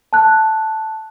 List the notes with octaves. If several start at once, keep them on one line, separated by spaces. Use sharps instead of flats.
A5 F#6